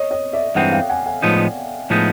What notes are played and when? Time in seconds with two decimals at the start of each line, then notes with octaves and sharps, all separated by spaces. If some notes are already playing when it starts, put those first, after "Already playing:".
Already playing: C#5 D#5
0.11 C#5 D#5
0.33 D5 E5
0.55 G2 E3 G#3 C4 D#4 E5 F#5
0.72 F5 G5
0.89 F#5 G#5
1.06 F#5 G#5
1.22 A2 F3 G#3 B3 D#4
1.90 A2 F3 G#3 B3 D#4